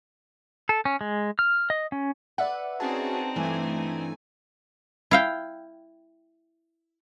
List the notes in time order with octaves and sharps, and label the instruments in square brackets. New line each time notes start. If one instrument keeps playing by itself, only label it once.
[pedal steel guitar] A4
C#4
G#3
F6
D#5
C#4
[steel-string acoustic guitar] B4 [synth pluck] D5 E5 F#5
[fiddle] C4 D#4 [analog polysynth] C#4 F#4 G#4 [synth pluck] A5
[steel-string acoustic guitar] G2 E3 D4 [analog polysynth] A3 G#5
[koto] E4 F5 G5